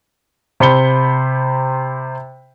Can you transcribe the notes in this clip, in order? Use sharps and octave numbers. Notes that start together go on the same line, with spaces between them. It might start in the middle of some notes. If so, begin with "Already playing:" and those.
C3 C5 B5 C#7 G7